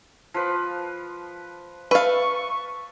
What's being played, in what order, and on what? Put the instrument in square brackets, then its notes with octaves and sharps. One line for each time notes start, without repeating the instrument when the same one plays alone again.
[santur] F3 B4
[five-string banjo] B4 F5 [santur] E5 A5 [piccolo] C#6